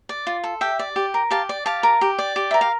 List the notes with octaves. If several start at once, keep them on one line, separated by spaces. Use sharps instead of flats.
D5
F4
A4
G4 E5 G5
D5
G4
A#4
G4 F5 A5
D5
G4 F5 A5
A#4
G4
D5
G4
A#4 E5
F5